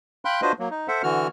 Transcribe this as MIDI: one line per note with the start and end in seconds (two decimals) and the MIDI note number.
0.25 0.41 77
0.25 0.41 79
0.25 0.41 83
0.25 0.41 84
0.25 0.41 90
0.42 0.52 62
0.42 0.52 65
0.42 0.52 66
0.42 0.52 71
0.42 0.52 72
0.42 0.52 75
0.59 0.69 54
0.59 0.69 58
0.71 0.88 63
0.88 1.02 69
0.88 1.02 72
0.88 1.02 76
0.88 1.02 78
1.03 1.27 50
1.03 1.27 52
1.03 1.27 66
1.03 1.27 89